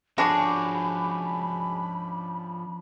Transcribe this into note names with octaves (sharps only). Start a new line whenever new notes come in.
F3 C#4 D4 F#4 G#4 B5 D6